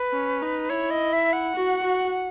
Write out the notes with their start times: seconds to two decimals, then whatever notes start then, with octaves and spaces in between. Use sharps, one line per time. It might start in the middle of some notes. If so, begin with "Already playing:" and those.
Already playing: B4
0.13 C#4
0.41 D#4
0.70 E4 C#5
0.90 D#5
1.13 E5
1.33 F#5
1.55 F#4
1.83 F#4